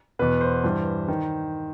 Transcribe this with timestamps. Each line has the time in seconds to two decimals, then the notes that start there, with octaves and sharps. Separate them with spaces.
0.19 E2 B2 B4
0.41 C5
0.64 G2 E3
1.08 D#3